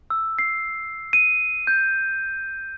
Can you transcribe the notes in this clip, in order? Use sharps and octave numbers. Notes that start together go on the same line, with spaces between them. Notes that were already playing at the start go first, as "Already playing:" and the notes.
E6
C7
D#7
G6